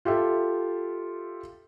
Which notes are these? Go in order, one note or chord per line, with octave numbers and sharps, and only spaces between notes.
F4 G4 A4 E5